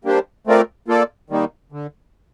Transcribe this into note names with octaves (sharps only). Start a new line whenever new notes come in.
G3 A#3 D4 G4 C5
A3 C4 F4 A#4 D5
A#3 F4 A4 D5
D#3 G3 A#3 D#4
D3